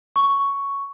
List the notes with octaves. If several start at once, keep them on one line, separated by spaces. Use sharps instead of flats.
C#6